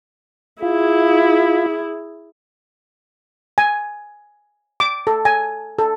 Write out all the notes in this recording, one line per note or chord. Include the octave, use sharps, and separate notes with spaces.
E4 F4 G#4
G#5
D6
A4
G#5
A4